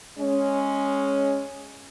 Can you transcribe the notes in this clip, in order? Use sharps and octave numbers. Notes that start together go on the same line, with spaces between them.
G#3 C#4